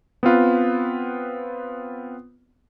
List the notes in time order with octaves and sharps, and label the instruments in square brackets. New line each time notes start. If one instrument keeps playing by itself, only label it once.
[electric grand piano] B3 C4 F4 B4